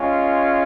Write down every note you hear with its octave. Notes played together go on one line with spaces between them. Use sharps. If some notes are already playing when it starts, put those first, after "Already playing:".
Already playing: G#3 C#4 F4